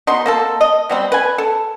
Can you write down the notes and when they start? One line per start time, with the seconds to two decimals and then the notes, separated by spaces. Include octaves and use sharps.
0.07 B2 D#4 C6
0.26 A#3 C4 A4
0.61 D#5
0.89 B2 G3 C4
1.12 B4 G#5
1.38 A4